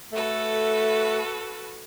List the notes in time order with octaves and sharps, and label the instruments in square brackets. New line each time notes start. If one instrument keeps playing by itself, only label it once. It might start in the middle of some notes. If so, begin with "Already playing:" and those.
[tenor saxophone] A3 [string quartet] F#4 A4 B4